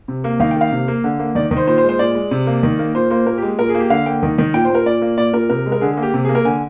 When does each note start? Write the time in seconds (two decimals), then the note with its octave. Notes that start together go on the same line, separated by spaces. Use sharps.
0.08 C3
0.24 A#3
0.40 D#3 F5
0.51 G5
0.56 A#3 F5
0.72 C3
0.88 A#3
1.04 D3
1.19 A#3
1.35 D#3 D5
1.51 D#3
1.57 C5
1.67 A#2 C5
1.78 C5
1.83 G#3
1.89 C5
1.99 A#2 D5
2.15 G#3
2.31 C3
2.47 A#3
2.63 D#3
2.79 A#3
2.94 A#2 C5
3.10 A#3 C5
3.26 A#2 A#4
3.38 G4
3.42 G#3
3.58 A#2 A#4
3.69 G#4
3.74 A#3 G4
3.90 D3 F5
4.06 A#3 G5
4.23 D#3
4.38 D#3
4.54 A#2 G5
4.65 C5
4.70 A#2 A#4
4.86 A#2 D5
5.02 A#3
5.18 A#2 D5
5.33 A#2 A#4
5.50 C3 A#4
5.66 G#3
5.72 A#4
5.81 D3 G#4
5.92 G#4
5.97 A#3
6.03 G4
6.14 C3
6.24 A#3 G#4
6.35 A#4
6.45 D3 G#5